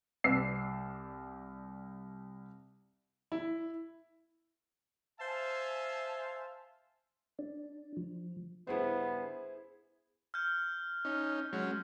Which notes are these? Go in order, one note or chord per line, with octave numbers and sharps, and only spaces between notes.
C2 D5 E6 C7
E4
C5 E5 F5 G#5 A5
D4
F3
G2 C#3 B3 E4 G#4 C5
F6 G6
C#4 D#4
F#3 G#3 C#4